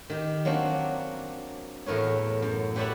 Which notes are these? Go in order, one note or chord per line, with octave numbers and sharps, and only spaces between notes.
D#3 G4
F#3 A#3 C4 D4 F#4
E2 A2 A#4 B4 C#5
F#2
G4 B4 C#5 D5 E5 F#5